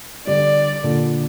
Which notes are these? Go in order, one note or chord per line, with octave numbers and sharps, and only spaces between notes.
D3 G3 D5
A#2 D3